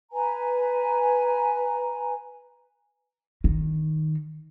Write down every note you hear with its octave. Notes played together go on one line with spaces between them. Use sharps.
B4 G#5 A#5
D#3